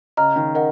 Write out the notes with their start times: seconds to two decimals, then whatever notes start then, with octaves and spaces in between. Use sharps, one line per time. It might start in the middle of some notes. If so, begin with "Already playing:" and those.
0.17 C#3 D#5 A#5 F6
0.36 D#3
0.55 A#4 D#5 F#5